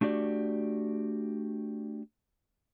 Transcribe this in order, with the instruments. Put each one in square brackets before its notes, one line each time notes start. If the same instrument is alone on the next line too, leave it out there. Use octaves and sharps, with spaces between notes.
[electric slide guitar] A3 D4 F#4 G4 D5